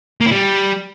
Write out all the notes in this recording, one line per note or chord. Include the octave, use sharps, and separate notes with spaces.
A#3
E4
G3